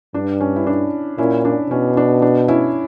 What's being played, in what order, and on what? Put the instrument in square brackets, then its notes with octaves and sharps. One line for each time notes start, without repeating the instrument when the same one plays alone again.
[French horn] G2 [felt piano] D4
[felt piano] C#4
E4
D4
[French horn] A#2 [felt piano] C#4 E4
[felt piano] D4
[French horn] B2 [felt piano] C#4
[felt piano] D4
D4
C#4 E4